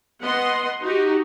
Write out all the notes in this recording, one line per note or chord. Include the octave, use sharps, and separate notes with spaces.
B3 D#5 F#5 C6
D#4 F#4 G4